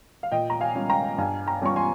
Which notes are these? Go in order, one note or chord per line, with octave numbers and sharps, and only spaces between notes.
F5
A#2 D#5 G5
A#5
F5 G#5
G3 C#4 F4
G5 A#5
G2 F5 G#5
G5 A#5
G3 C#4 F4 C#6
G#5 C6